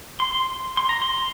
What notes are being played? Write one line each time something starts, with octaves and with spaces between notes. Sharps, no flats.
C6
C6
A#5
C6